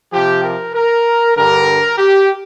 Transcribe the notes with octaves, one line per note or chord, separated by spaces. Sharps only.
C3 F3 G4
A#4
A#4
G2 D3 G3 A#4
G4